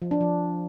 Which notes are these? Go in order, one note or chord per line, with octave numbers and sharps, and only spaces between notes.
F3
D4
F3